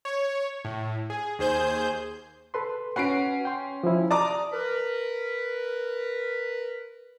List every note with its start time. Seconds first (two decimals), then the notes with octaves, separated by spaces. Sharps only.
0.05 C#5
0.65 A2
1.10 G#4
1.39 D#2 G#4 C5 G6
2.54 A4 B4 C6
2.96 C#4 F#4 B4 F#5 C7 D7
3.45 G5 C6
3.84 F3 E4
4.11 D5 A5 A#5 D6 D#6
4.52 A#4 B4